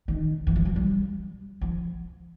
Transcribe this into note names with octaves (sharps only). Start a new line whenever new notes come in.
D#3
E3
F3
F#3
G3
F3